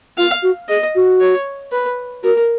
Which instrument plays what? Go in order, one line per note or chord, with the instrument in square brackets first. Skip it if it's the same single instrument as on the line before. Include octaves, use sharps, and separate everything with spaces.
[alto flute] F4 [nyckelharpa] F5
[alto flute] F#4
[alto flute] G#4 [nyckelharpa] D#5
[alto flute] F#4
[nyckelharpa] C#5
B4
[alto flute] F#4 [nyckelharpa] A#4